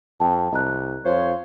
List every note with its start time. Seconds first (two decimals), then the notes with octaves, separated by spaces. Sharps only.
0.20 F2 G5 A5
0.52 C2 D#5 A#5 F#6
1.05 F2 F4 C5 C#5